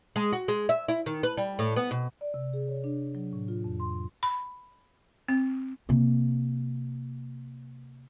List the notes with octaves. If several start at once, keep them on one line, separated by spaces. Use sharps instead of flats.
G#3
F#4
G#3
E5
E4
D#3
B4
G3
A2
B3
B2
D5
C3
G#4
C#5
D4
F#3
A2
F4
F2
C6
B5
C4
C3 A#3